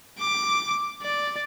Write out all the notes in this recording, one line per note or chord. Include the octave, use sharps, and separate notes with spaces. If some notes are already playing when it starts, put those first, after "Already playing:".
D6
D5